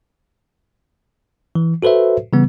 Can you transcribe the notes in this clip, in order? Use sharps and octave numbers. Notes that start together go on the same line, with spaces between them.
E3
F#4 A4 B4 C5 E5
C#3 E3 G3 B3